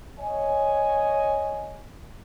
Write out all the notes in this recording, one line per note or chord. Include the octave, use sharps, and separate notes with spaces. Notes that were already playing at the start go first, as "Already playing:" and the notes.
C#5 D#5 G#5